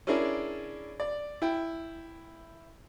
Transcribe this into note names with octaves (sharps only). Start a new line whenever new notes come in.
C#4 D4 E4 G#4 A#4 D5
D5
E4 G5